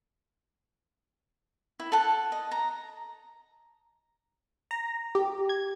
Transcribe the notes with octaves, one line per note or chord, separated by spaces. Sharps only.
E4
A4 F#5 A5
D#5
A#5
A#5
G4
G#6